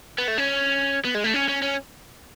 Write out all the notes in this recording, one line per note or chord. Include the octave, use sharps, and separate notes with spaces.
B3
A3
C#4
B3
G#3
A3
C#4
C#4
C#4